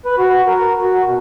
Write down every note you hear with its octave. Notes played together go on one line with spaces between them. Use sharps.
B4
F#4
A#4
F#4
B2